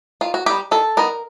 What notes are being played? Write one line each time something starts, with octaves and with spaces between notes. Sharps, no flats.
D#3 F4
F#4
G3 B3 D#4 G4
D#3 A4
G3 B3 D#4 A#4